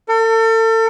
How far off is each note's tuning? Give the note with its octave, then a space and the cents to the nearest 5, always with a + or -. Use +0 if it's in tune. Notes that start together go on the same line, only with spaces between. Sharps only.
A4 +40